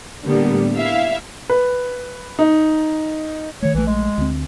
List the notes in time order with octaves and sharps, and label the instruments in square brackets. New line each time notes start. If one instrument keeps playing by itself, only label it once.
[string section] A2 D3 G3 A#3 B3
E4 E5 F5
[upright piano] B4
D#4
[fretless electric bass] D#3 A3 [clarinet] C#5
[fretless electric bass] A#1 A3 [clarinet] E3
[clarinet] G#3
[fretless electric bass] D2 C4